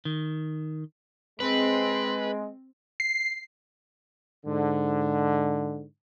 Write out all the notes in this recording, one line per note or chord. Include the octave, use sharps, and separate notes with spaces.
D#3
G#3 C4 B4
C7
G#2 D3